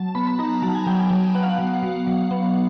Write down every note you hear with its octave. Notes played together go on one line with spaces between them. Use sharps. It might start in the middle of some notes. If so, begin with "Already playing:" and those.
Already playing: F#3 A5
B3 B5
B5
D#4 A#5
F#3 A5
G#5
F#3 G5
G#5
F#3
B3 F#5
F5
F#5
F#3
F#3
F#3
B3